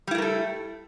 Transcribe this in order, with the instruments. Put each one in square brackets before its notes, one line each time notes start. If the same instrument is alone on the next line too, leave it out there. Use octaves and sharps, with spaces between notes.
[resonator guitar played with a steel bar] G3
E4
A3
A#4
A4